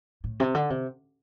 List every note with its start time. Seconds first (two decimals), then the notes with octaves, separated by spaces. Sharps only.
0.24 A2
0.40 C3
0.55 D3
0.70 C3